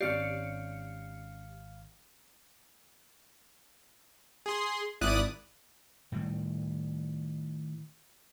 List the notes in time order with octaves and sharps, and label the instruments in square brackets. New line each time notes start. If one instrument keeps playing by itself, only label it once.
[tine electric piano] G#1 F5 C7 [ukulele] C#4 D#4 D5 [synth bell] G4 C#7
[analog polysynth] G#4 C6
G#1 E4 D5 D#6 F#6 D#7
[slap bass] A2 D#3 G3